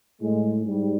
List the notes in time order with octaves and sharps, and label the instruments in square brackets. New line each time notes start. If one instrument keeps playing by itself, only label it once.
[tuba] A2 [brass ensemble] G#3
[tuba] G#2 [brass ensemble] G3